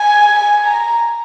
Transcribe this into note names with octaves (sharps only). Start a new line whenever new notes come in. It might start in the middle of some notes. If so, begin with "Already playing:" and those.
Already playing: G#5
G#5
A#5